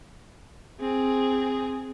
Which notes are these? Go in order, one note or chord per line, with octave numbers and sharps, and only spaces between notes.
C4 G#4